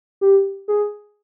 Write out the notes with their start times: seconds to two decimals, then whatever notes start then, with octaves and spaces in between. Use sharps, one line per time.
0.21 G4
0.68 G#4